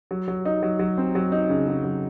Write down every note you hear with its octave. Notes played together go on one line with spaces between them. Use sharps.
F#3
F#3
D#4
F#3
F#3
C4
F#3
D#4
C#3
C#3
F#3